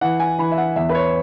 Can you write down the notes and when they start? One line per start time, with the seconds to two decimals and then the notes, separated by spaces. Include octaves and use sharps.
0.01 E3 F#5
0.20 G#5
0.38 E3 B5
0.52 E5
0.58 F#5
0.76 E2 E5
0.89 B4
0.95 C#5